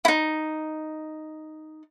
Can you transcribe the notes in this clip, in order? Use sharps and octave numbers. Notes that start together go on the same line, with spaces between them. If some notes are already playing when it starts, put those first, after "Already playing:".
D#4 E4